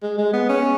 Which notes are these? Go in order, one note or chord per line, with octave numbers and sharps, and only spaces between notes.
G#3
G#3
B3
C#4